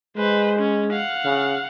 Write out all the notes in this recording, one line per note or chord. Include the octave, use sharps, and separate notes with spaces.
G#3 B4 C5
C#4
F5 F#5
C#3